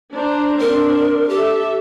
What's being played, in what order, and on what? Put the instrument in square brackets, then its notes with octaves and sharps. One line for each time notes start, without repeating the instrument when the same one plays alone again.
[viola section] D4 C5 A#5
[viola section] C4 D4 [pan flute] A#4
[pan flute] G4 [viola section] A4 E5